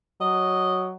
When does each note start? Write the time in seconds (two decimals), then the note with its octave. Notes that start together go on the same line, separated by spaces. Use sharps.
0.21 F#3 D#5